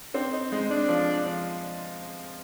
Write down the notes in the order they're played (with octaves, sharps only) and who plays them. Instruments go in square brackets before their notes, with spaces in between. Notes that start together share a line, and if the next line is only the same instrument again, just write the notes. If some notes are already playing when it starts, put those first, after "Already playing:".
[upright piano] C4 [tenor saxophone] D4
[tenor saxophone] D#4
[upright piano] G#3 [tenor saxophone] D#4
[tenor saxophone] D4
[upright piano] F3
F3